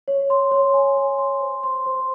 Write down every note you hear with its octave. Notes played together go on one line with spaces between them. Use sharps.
C#5
C6
C#5
G#5
C#5
C6
C5
C6
C5